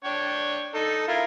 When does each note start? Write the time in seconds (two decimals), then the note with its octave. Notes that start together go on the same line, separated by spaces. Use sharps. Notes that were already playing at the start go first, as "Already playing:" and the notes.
0.04 D4 C#5 G5
0.75 D#4 A4
1.08 E4 F4 A#4